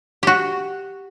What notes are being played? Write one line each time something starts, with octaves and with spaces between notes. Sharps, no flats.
F#4 G4